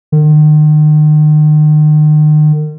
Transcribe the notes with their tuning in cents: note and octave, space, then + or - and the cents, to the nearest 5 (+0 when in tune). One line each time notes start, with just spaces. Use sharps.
D#3 -40